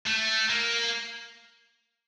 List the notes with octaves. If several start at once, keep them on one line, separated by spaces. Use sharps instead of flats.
A3
A#3